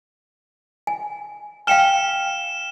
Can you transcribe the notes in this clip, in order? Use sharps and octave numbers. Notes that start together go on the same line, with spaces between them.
G#5
F5 G5 G#5 F6 E7